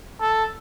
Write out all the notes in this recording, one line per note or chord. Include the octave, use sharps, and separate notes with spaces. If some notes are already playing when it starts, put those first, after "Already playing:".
A4